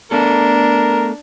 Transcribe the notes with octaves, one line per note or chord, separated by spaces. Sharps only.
A3 B3 D4 A4 A#4